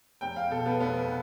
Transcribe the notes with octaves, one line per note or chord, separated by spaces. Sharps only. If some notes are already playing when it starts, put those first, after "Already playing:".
F1 G5
F5
B2 A4
B3
F1 B3